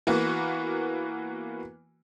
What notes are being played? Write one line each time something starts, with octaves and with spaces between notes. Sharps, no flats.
E3 A#3 B3 F#4